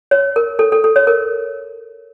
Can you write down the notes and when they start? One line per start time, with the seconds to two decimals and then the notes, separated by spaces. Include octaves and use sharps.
0.11 C#5
0.36 A#4
0.59 A4
0.72 A4
0.84 A4
0.96 C#5
1.07 A#4